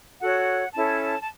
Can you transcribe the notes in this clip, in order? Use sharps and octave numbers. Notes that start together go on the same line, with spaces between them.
F#4 A4 C#5 F#5
C#4 E4 A4 C#5 A5
A5